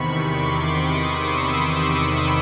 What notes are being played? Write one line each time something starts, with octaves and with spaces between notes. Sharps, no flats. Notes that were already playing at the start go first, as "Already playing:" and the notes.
Already playing: E2 C3 D#3 B5 C#6
C6 D6
C#6 D#6
D6 E6